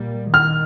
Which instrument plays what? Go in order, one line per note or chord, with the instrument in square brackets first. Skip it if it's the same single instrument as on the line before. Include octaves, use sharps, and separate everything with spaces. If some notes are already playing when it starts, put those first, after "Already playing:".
Already playing: [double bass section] A#2 G3 A#3
[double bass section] D#3 [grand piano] F6